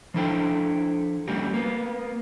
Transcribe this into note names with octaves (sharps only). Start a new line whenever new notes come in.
F3 D4 E4 A4 G5
G3 A#3 C#4 F#4 G4
A#3 B3